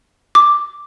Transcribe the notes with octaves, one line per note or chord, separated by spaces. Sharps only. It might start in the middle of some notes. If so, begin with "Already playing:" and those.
D6